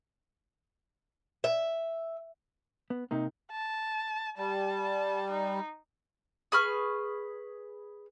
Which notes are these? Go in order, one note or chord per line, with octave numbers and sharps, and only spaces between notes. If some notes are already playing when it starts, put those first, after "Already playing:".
E5
B3
C3 A#3 D#4
A5
G3 A5
D#4
G#4 B4 C#6 F6